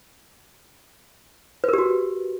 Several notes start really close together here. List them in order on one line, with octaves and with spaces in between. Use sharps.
B4 A#4 G4 F#4